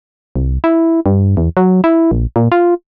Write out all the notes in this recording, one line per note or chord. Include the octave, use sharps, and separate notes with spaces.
C2
E4
G2
E2
F#3
E4
A#1
A#2
F4